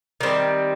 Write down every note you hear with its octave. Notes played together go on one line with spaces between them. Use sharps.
D#3 G3 C4